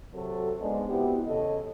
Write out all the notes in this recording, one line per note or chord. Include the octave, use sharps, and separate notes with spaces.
C3 F#3 A4
G#2 G#3 B3 D4
C3 B3 E4 F#4 G4
E2 C#3 A4 C#5 D#5